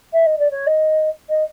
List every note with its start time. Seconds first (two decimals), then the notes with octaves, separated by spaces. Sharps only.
0.13 E5
0.26 D#5
0.38 D5
0.50 C#5
0.66 D#5
1.29 D#5